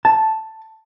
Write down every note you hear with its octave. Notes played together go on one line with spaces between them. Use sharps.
A5